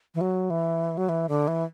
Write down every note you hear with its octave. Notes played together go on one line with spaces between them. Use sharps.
E3
F#3
E3
F#3
E3
D3
E3